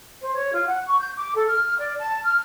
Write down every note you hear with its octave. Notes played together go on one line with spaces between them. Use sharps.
C5
C#5
F4
F#5
C#6
G6
D6
A4
F6
D5
A5
F6